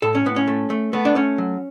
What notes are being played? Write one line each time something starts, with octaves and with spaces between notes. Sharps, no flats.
A2 A4
C#4
A2 B3
C#4
A3
A3
A3 B3
D4
A3 C#4
F#3